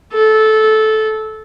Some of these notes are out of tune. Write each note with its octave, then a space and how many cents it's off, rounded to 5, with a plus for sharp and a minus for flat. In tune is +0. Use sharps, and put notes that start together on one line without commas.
A4 -15